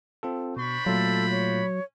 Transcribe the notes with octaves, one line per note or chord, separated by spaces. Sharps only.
C4 F4 A4
B2 D4 C5 B5 C#6
A#2 F#3 A3 F4 A4
C#5